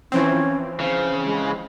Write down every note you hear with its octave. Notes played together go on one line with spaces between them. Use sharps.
E3 F3 C4 C#4
C#3 C5
G#3